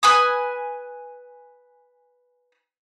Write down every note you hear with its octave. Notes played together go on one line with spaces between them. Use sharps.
B4 G#5 D#6